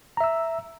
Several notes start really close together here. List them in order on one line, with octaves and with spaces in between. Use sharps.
A#5 E5 E6